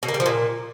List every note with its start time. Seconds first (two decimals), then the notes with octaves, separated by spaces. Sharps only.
0.03 B2
0.08 A#3
0.14 G3
0.20 F3
0.26 A#2